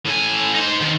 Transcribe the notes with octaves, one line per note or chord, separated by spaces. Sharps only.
A2 G#5
D#4 C5
D#3 F3